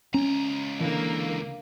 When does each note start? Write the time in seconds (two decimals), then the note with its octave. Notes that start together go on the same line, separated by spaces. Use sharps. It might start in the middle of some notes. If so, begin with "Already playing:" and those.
0.14 C#2 C#4 A#5
0.81 D3 E3 A#3